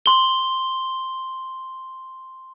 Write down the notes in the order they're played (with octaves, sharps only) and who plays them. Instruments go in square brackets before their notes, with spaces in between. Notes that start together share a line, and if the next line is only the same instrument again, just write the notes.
[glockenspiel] C6 G7